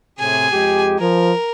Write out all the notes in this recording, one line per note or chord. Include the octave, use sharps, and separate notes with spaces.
A2 C3 G#4 G#5
F2 G#3 G4
F3 A#4